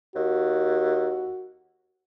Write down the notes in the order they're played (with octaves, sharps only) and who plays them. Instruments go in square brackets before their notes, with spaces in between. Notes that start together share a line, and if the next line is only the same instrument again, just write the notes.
[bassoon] D#2 [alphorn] F#4